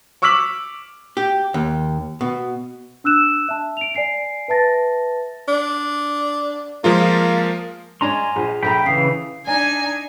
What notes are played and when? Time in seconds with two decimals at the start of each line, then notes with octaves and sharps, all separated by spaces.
0.22 C#6 D6 E6 F6 B6 F#7
1.17 G4
1.54 D#2
2.21 B2
3.04 D4 E6 F#6 E7
3.49 E5 A5
3.77 D7 F7
3.94 D5 G#5 C7 D7
4.48 B4 E5 A5 A6 A#6
5.49 D4
6.84 F3 G#3 A#3 F4
8.01 G#3 C#4 D4 G#5 A#5 C6
8.36 A#1 F3 G#4
8.63 A#1 A3 G5 A#5 B5
8.86 C#3 E3 F5 D#6 C7
9.46 D4 D#4 G#5